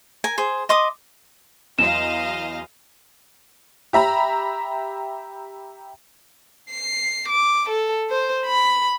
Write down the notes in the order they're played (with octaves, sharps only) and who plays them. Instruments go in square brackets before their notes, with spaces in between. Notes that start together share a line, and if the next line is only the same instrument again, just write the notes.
[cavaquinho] A#4 G#5
G#4 C5
D#5 C6 D6 D#6
[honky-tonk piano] E2 F#3 C6 [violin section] D#5 F5 [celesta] E7
[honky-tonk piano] G4 E5 A#5 B5
[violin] C7
D6
A4
C5
B5